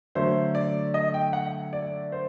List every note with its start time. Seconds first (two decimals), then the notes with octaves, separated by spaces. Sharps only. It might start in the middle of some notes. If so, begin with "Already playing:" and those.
0.15 D3 F#3 A3 C5
0.55 D5
0.94 D#5
1.14 G5
1.33 F#5
1.73 D5
2.12 C5